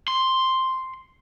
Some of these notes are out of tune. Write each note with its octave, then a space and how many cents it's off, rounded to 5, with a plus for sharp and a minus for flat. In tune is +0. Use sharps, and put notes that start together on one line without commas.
C6 +0